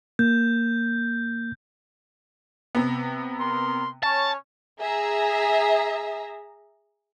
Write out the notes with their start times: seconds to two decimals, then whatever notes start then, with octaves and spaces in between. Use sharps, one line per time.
0.19 A#3 G6
2.75 C3 B3
3.39 A#4 C6
4.03 C#4 C#5 A5
4.80 G#4 E5 A#5